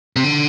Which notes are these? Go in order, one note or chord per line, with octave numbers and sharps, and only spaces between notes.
C3
D3